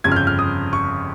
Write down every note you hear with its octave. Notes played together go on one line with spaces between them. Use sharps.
G1 F2 C#3 G#6
F6
G6
F6
D#6
C#6